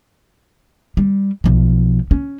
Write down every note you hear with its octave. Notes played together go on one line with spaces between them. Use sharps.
G3
B1 F3
C#4